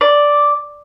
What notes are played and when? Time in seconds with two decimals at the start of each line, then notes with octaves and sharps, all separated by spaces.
0.01 D5